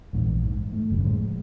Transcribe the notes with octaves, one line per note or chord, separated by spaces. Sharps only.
A#1 G#2 B2 E3
G#2
A3
F#1 C2 G2 D3
A2 F3 G#3